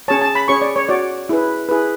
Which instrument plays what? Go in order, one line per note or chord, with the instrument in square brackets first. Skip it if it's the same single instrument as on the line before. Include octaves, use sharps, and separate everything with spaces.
[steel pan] C#4 G#4 C#5 A5
A5
B5
C#4 G#4 C#5 C#6
D5
C#5
F#4 C#5 D5
E4 G#4 B4
E4 G#4 B4